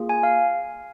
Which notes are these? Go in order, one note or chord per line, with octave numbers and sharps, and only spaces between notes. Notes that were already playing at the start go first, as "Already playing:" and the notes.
Already playing: A#3 F4 G#4
G#5
F5